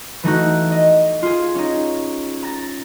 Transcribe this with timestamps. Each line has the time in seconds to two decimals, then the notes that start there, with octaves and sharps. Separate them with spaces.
0.23 E3 A3 D#4 F#4
0.71 D#5
1.23 F4 G#4
1.55 C#4 D#4
2.43 A#5 A6